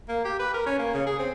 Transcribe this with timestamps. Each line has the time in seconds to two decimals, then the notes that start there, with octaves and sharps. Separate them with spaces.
0.09 A#3
0.25 G4
0.40 B4
0.54 A#4
0.66 C#4
0.79 A#3
0.94 C#3
1.07 G#4
1.19 C4